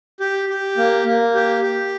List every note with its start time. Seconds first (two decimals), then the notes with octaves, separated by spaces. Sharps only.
0.20 G4
0.49 G4
0.77 A#3
1.06 A#3
1.35 G4
1.62 G4